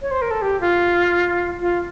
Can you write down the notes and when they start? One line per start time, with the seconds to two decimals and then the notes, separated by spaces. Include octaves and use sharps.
0.02 C#5
0.11 C5
0.22 A#4
0.31 A4
0.42 G4
0.61 F4
1.60 F4